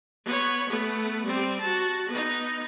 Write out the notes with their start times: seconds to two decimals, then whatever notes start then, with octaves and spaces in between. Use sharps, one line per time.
0.25 B3 C#5
0.69 A3 B3
1.24 G3 C4
1.61 F#4 A5
2.09 B3 D#4